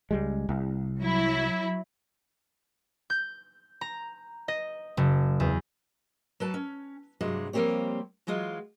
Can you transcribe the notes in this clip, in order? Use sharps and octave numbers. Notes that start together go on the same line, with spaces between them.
C#2 G3 G#3
C2
F#3 E4
G6
A#5
D#5
F#1
E2
F#3 B4 A5
C#4
G2 C3 F#3 G#3
F3 G3 A#3 C4 G4 C#5
E3 F#3 G#3 F4